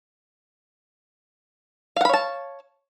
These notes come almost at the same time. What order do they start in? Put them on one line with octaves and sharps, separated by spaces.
F5 F#5 B5 C#5 A5